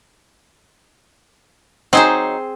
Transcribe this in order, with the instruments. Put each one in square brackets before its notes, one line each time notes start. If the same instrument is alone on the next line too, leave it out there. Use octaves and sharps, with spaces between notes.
[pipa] F#3 D#4 [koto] C4 G#4 C5